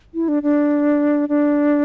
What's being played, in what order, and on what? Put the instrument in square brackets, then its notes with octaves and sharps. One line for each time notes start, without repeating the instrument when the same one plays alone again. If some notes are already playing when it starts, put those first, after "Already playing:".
[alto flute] E4
D4
D4
D4